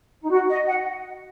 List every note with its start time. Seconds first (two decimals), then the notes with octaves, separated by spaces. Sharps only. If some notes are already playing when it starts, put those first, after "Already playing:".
0.21 D#4
0.30 F#4
0.49 D#5
0.67 F#5